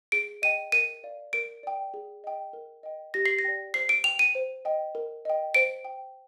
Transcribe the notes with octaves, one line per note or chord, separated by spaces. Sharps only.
G#4 D7
D#5 G5 D#7
A#4 D#7
D5 F5
A#4 D7
D5 G5
G#4
D#5 G5
A#4
D#5 G5
G4 A#6
C7
A#6
D5 G5
C5 C7
D7
G5 F7
D#7
C5
D#5 G5
A#4
D#5 G5
C5 D7
G5